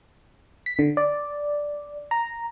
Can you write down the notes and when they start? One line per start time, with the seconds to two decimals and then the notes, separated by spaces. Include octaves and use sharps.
0.66 B6
0.79 D3
0.97 D5
2.11 A#5